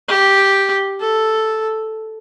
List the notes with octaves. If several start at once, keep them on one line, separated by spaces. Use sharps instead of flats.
G4
A4